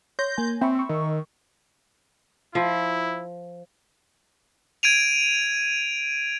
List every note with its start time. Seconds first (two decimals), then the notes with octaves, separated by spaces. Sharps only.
0.19 C#5 C6 G6 A#6
0.38 A#3 G#5
0.61 C4 E5 B5 C#6
0.75 C#6 E6
0.89 D#3
2.55 F3 E4
4.83 G#6 D7 D#7 F7